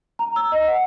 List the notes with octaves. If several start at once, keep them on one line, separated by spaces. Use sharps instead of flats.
A#5
E6
D#5
F#5